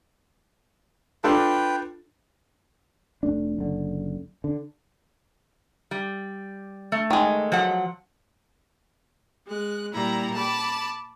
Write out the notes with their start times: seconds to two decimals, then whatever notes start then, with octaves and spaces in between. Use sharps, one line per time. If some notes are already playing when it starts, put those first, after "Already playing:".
1.24 D4 F4 A4 B4 G5
3.23 F1 A3 D4
3.59 F#1 D3
4.44 D3
5.91 G3
6.92 A3
7.10 D#3 G#3
7.52 F3 F#3 F#5
9.46 G#3 F#6
9.92 A#2 G3 E4 A#5
10.33 A5 B5 D6